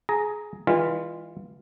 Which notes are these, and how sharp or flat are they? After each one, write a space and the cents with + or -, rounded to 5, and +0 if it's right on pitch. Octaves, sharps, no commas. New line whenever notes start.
G#4 +15 A#5 +0
E3 -25 G#3 -40 F4 -10